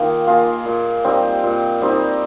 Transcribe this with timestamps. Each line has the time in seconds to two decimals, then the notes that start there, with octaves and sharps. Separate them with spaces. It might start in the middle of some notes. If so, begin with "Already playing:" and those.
Already playing: D#3 A#3 F4 G#4
0.27 A#3 F4 G#4
0.65 A#2
1.04 G3 C4 D#4
1.43 A#2
1.81 G3 C4 D#4